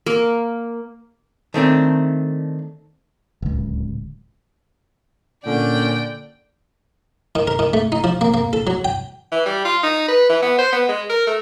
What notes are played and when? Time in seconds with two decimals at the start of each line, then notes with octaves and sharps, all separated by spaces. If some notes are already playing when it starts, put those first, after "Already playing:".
0.06 A#3
1.54 D#3 A3 C4 D4
3.42 D1 C#2
5.46 A#2 D3 C#4 D5 G5
7.35 D#3
7.47 A#4
7.59 D#3
7.73 A3
7.92 D#4
8.04 F3
8.21 A#3
8.34 A#3
8.53 A4
8.67 F#3
8.85 G5
9.32 E3
9.46 G3
9.65 F4
9.83 D#4
10.08 B4
10.30 E3
10.43 B3
10.59 C5
10.73 B3
10.89 G#3
11.10 A#4
11.27 A3